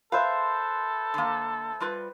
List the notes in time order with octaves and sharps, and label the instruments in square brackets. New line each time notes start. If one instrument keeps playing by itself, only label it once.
[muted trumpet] A4 [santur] B4 C5 E5 [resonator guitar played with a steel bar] F5
[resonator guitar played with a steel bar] D3 A#3
G3 F4 B4